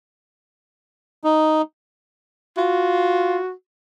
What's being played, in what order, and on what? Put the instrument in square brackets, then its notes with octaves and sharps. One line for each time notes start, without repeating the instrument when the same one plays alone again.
[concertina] D#4
[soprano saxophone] F4 [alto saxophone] F#4